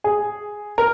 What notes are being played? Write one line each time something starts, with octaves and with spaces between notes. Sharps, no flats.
G#4
A#4